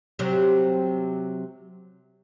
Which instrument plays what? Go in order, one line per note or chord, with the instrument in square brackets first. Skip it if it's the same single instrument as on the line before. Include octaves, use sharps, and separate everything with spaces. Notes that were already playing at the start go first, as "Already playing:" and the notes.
[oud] C3 F#3